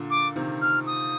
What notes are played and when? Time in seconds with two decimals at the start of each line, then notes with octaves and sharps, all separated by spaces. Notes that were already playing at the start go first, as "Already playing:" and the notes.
Already playing: A#2 D3
0.10 D6
0.36 C3 D#3
0.62 F6
0.87 D#6